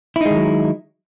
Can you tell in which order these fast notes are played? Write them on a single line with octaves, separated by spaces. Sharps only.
E4 D#4 G#3 D#3 F#3